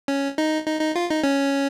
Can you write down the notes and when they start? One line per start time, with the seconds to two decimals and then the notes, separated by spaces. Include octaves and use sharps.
0.08 C#4
0.38 D#4
0.66 D#4
0.81 D#4
0.96 F4
1.10 D#4
1.23 C#4